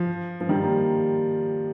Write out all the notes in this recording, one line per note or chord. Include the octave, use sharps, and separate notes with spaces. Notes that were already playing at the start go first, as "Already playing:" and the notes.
Already playing: F3
F3
D#3 G3
G3 A#3